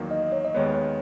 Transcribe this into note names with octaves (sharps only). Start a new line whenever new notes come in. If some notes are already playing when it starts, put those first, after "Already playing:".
Already playing: E2 D#3 F#3 A#3
D#5
C#5
D#5
D#2 D#3 G#3 B3 C#5